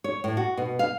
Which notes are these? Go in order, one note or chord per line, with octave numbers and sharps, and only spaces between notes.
C#5
A2
F#4
B2
F5